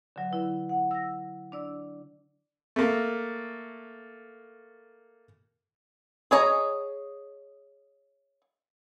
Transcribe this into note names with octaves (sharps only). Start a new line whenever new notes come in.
D3 F#3
D3 E4 B4
F#5
E6 A#6
D4 D5 E6
A3 A#3
G#4 C#5 D#5 A#5